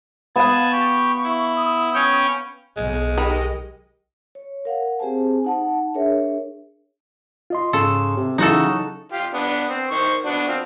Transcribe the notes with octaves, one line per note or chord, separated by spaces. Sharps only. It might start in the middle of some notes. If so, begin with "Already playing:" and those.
B3 F5 F#5 G#5 A5
G4 C#6
E4
D#6
C#4 C#5 G5
B1 B2 G#3
D#3 G4 D#5 B5
C#5
A#4 F5 F#5
C4 G4 G#4 C5 G#5 A5
D#4 F#5 A5
D4 G#4 A#4 C#5 E5
F4 D#5 C6
G#2 C#3 A4 C6
C3
C#3 E3 F#3 D#4 E4 F#4 A4
F4 G4
B3 D4
C4
D#3 C5 C#6
B3 D4 F#4
C4 F4